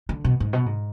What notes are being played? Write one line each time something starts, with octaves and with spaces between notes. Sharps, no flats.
D3
B2
G#2
B2
G#2